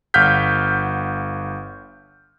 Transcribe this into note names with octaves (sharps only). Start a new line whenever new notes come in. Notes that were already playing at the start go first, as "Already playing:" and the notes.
G1 F5 F#5 F6 G6 B6